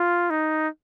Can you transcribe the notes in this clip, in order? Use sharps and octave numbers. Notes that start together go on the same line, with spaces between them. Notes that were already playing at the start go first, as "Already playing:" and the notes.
Already playing: F4
D#4